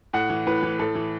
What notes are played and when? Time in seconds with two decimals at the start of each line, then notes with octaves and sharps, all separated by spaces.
0.13 A2 F#5
0.30 E3
0.47 A2 B4
0.63 E3
0.79 A2 A4
0.95 E3